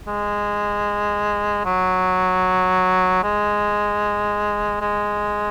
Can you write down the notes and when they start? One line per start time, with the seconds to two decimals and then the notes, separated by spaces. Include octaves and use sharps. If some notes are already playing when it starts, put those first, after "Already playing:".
0.07 G#3
1.65 F#3
3.24 G#3
4.81 G#3